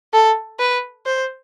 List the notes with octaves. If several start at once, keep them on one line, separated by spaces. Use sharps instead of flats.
A4
B4
C5